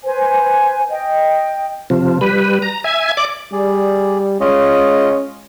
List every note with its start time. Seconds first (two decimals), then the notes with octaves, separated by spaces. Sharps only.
0.04 B4 C5 G#5
0.90 D#5 G5
1.90 C3 F3
2.21 G3 B4
2.62 A#5
2.84 E5 G#5 G#6
3.17 D5 D6
3.53 G3 G#4 D5
4.41 G#3 C#4 F4 D#5